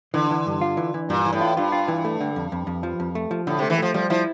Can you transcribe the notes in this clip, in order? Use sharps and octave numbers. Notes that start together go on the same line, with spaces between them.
D3 E3
E3
G2
F4
E3
E3
G2 A#2
E3
A2
F4
G2 F4
F4
E3
A3
D3
F2
F2
F2
F3
F2
A3
F3
A2 D3
C3 A3
E3
F3 A3
F3 G3
F3 E4